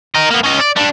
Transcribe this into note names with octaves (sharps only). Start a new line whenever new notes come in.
A#4 D#5
A#3 B3
C#4 D#5
D5
G3 D4